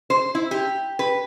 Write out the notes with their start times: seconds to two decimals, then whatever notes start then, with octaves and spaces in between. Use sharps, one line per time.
0.10 C5
0.35 E4
0.51 G4
0.99 B4